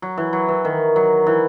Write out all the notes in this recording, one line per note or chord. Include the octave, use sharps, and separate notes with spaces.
F#3
E3
F#3
E3
D#3
F#3
E3